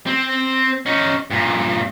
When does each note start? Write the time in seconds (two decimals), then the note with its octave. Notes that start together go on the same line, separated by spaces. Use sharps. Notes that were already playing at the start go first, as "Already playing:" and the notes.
0.07 C4
0.86 C#4 D#4
1.30 G2 A#2